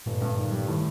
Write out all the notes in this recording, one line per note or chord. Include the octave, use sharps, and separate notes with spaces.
G1 A#2
G2
D#3
G3
A2 D#3